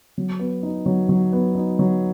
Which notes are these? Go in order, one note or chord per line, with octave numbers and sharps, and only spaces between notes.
F#3
B3
D#4
F#3
F#3
B3
D#4
F#3